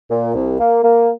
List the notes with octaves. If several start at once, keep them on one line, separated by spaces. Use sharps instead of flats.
A#2
C2
A#3
A#3